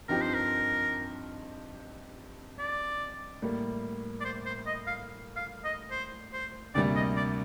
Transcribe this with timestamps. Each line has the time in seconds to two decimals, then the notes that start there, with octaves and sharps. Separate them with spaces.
0.09 G2 F3 C4 D#4 G4 A#4
0.22 C5
0.35 A#4
2.59 D5
3.42 A2 G3 A#3
4.21 D5
4.25 C5
4.46 C5
4.67 D#5
4.87 F5
5.36 F5
5.64 D#5
5.91 C5
6.33 C5
6.75 D2 C3 G3 A#3 D5
6.96 D#5
7.17 D5